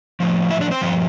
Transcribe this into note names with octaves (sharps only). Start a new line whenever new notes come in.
A2 F3
E4 E5
D4 D5
C4 C5
G2 F3